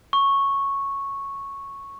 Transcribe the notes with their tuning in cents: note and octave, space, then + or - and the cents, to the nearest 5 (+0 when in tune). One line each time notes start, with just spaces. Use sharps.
C#6 -5